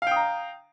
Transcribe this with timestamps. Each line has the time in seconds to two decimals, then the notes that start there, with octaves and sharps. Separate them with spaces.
0.02 F5
0.07 G5
0.11 D#6
0.16 A#5